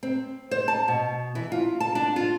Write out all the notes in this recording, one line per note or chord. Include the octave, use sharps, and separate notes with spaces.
C4
C5
A5
B2
E3
F4
A5
D4
F4